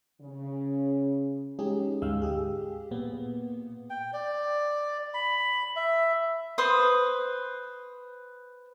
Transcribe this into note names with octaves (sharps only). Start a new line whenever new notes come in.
C#3
G#3 C#4 D#4 G4 G#4
D2 G#2 G#3 F5 E6
G4 G#4
A#2 A#3 B3
G5
D5
B5
E5
B4 C5 D#6